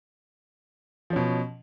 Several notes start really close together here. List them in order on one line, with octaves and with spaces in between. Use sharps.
F3 C#4 B2